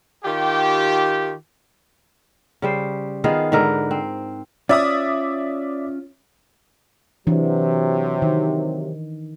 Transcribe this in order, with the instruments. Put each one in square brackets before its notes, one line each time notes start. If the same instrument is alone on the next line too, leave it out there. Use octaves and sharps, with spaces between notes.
[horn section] D#3 F4 G4
[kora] C#3 G3 C5
D#3 B3 F4 G#4
G#2 D3 A#4 B4
C4
[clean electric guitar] C#4 F4 C#5 [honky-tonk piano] D5 E5 D#6
[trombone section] C3 F#3 [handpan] E3 D4
[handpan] D#3